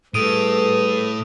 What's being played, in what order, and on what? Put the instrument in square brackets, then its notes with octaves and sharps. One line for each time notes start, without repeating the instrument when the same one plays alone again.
[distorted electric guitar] A2 [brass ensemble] G3 G#4 B4 [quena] A4 [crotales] D#6 D7 D#7